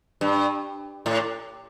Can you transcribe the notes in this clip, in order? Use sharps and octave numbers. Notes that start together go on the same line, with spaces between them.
G2
A2